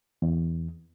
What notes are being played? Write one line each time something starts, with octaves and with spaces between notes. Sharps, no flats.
E2